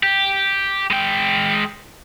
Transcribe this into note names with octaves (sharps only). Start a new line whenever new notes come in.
G4
G#3 G5